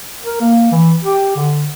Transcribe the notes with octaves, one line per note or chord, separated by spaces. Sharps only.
A#4
A#3
E3
G4
D3